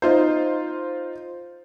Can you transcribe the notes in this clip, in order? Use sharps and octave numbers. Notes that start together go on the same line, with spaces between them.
D#4 F4 C5